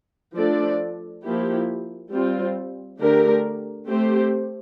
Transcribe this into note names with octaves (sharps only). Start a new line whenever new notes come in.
F3 A3 D4 A4 D5
F3 A#3 E4 G4
G3 C4 F4
D3 A3 D4 G4 A#4
A3 C4 G4 C5